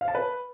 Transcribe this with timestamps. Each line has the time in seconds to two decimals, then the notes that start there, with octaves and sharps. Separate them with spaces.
0.01 F5
0.08 A5
0.15 B4